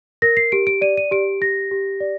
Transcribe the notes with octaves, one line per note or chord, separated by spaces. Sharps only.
A#4 A#6
C7
G4 D7
D7
D5 D#7
D#7
G4 D7
G4 A#6
G4
D5